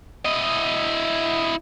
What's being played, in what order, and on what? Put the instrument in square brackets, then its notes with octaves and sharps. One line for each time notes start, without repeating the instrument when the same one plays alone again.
[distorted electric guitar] E4 D#5